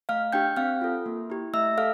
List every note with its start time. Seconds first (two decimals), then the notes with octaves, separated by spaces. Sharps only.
0.09 A3 F5 F6
0.33 D4 G4 G5 G6
0.57 C4 F5 F6
0.81 F4 A4
1.06 A#3
1.30 E4 G4
1.53 A3 E5 E6
1.77 A4 F5 F6